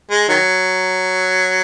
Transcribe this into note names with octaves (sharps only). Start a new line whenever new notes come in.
G#3
D#3 F#3